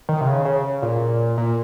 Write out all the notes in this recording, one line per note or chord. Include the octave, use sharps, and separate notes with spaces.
D#3
C3
C#3
C#3
A#2
A#2